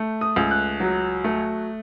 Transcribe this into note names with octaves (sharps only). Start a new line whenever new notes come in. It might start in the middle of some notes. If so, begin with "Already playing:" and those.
Already playing: A3
D#6
C#2
F#6
F#3
A3